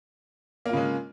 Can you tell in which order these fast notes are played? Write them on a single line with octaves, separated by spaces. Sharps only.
A#3 F4 C#3 G#3